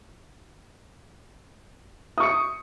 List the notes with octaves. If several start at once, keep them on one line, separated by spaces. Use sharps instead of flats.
C#6 D#6 C#7